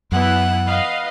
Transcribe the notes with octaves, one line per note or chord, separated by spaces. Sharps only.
F#2 E3 B3 E4 F#5
B4 D#5 F5